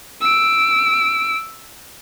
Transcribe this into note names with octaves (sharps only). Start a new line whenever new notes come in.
E6 D7